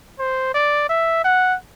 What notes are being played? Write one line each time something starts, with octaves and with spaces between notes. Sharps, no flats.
C5
D5
E5
F#5